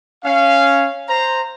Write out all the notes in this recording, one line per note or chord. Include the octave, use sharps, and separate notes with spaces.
C#4 F5
C5 A#5